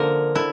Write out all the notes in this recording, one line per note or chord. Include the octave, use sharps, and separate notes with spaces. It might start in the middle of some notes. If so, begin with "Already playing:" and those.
Already playing: D3 F3 A#3 A#4
D3 E4